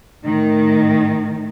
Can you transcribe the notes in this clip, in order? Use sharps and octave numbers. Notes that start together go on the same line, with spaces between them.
A2 D#3